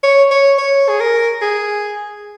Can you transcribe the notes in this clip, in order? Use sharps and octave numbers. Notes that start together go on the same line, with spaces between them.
C#5
C#5
C#5
G#4
A#4
G#4